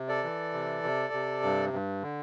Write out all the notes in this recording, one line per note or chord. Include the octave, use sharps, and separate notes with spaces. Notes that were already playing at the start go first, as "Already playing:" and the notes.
Already playing: C3
A4 D5
E3
C3
C3
C3
G2
G2
D3